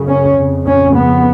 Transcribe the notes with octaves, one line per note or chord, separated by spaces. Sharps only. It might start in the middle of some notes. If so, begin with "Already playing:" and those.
Already playing: F#2 C#3
C#4
F2 C#3
C#4
B3